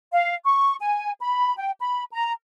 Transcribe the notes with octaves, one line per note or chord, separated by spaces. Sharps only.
F5
C#6
G#5
B5
G5
B5
A#5